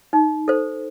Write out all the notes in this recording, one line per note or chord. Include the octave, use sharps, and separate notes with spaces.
D#4
A4 C5